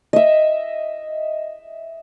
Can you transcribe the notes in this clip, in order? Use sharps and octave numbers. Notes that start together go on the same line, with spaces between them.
D#5 E5